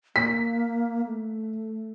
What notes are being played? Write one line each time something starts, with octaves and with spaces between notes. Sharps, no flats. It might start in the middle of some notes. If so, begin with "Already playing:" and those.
A#3 B6
A3